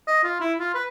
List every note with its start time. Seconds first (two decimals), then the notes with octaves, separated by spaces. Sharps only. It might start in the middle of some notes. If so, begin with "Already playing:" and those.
0.07 D#5
0.24 F4
0.40 E4
0.59 F4
0.74 B4